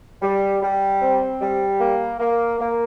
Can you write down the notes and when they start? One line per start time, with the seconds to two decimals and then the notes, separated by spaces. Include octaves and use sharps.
0.22 G3
0.61 G3
1.01 C4
1.40 G3
1.80 A#3
2.20 A#3
2.59 A#3